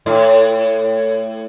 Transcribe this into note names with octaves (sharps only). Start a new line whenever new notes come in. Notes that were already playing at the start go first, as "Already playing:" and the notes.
A2